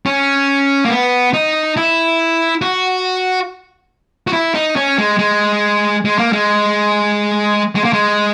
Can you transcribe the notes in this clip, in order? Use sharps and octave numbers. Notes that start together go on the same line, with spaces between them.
C#4
A#3
B3
D#4
E4
F#4
F#4
E4
D#4
C#4
G#3
G#3
G#3
A#3
G#3
G#3
A#3
G#3